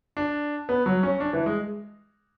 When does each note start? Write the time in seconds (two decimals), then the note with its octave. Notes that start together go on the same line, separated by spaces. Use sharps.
0.17 D4
0.69 B3
0.86 F#3
1.03 C#4
1.20 D4
1.33 E3
1.46 G#3